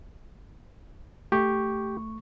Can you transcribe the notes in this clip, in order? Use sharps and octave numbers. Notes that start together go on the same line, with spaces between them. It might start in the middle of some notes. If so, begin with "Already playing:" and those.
A3 G4 C#6